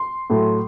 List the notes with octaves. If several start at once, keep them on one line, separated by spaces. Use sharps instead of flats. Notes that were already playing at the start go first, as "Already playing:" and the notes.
Already playing: C6
A2 F#3 A3